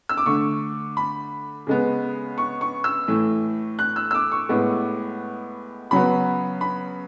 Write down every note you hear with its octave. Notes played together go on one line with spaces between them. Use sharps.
E6
D6
D3 A3 C#6
B5
C#3 G#3 B3
C#6
C#6
E6
A2 E3 A3
F#6
E6
E6
D6
C#6
A2 G#3 B3
C#3 F#3 B3 B5
B5